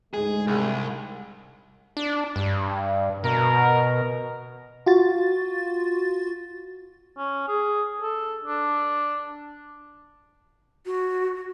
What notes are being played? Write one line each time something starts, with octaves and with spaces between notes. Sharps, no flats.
D2 G#2 G#3 G#4
C2
D4
G2
B2 A#4
F4 F#4 A6
C#4
G#4
A4
D4
F#4